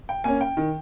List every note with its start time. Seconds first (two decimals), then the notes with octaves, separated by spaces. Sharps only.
0.09 G5
0.24 A#3 C#4 G#5
0.41 G5
0.57 D#3